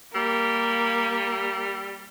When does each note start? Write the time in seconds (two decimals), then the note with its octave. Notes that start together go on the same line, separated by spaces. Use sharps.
0.15 G3 A#3